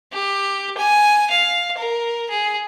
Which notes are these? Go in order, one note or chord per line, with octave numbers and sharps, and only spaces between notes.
G4
G#5
F5
A#4
G#4